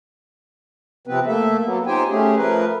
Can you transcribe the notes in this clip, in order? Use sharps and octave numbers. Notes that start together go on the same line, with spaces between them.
C3 F3 B3 C4 B4
A3 A#3 A4 E5
F#3 A#3 B3
D#4 F4 G4 C5 G5 G#5
A3 C#4 G4 G#4
F3 A3 A#4 B4